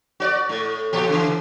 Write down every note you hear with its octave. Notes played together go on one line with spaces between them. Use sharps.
F#4 C#5 D5
A2
A#2 F3 G4
C#3 E3